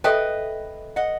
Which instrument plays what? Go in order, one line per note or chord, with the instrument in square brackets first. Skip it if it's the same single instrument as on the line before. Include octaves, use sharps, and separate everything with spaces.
[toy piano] A4 E5 G5 [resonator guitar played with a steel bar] B4 D#5
[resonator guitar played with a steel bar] D#5 F#5